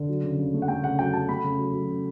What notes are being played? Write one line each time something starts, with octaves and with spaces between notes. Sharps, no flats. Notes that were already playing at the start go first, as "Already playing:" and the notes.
Already playing: D3
F#3
C#3
C#3
A3
F#5
A3 G5
C#3 F#5
F#3 G5
F#3 A5
A3 B5
C#3
F#3
F#3
C#3